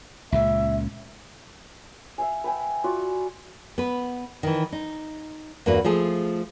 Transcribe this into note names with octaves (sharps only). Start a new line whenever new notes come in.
C#2 A#2 C#3 E5
E5 F5 G#5
B4 G5 G#5
F4 F#4 D5
B3 B4
D#3 E3
D#4
E2 G2 A#3 F#4 B4
F3 A3 F4 G#4